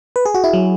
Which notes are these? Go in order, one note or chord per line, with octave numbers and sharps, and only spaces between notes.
B4
G#4
F#4
E4
F#3